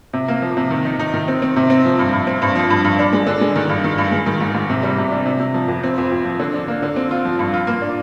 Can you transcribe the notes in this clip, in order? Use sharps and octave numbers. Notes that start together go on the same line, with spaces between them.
C3
A#3
F3
C3
D#3
D#4
D#4
D#3
C4
C4
C3
C4
F3
G2
G2
C4
G2
F3
G2
G2
D4
G#3
D3
G#3
D#3
G2
D#3
G2
G#3
D#3
G#2
G#2
C3
G3
C3
D4
C3
C3
F3
F2
C4
F2
F2
F3
D3
D4
A#3
D3
C4
F4
F3
G2
F4
A#3
D4